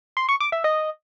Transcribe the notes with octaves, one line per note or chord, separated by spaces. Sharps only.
C6
C#6
D6
E5
D#5